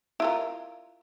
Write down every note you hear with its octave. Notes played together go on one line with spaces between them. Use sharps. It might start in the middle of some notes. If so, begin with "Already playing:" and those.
E4 F4 A#4